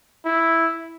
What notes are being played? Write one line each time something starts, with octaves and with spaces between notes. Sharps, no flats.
E4